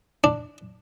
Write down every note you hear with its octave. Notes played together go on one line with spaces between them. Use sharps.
D4